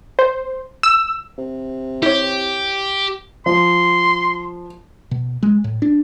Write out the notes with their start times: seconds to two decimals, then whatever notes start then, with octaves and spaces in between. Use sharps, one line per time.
0.19 C5
0.83 E6
1.38 C3
2.03 E4 G4 C#5
3.46 F3 C6
5.11 B2
5.43 G#3
5.64 A2
5.82 D4